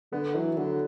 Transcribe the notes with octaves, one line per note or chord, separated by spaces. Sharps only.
D3 B3
E3 F#3
D3 F#3